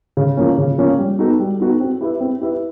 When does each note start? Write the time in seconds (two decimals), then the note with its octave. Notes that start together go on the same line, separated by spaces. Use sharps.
0.17 C#3
0.37 F3 A#3 C#4
0.58 C#3
0.78 F3 A#3 C#4
0.98 G3
1.19 B3 D#4 F#4 A4
1.39 G3
1.60 B3 D#4 F#4 A4
1.80 C4
2.01 E4 G4 B4 E5
2.21 C4
2.41 E4 G4 B4 E5